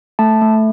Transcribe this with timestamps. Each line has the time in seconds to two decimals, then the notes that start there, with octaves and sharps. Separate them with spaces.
0.19 A3 A5
0.41 A3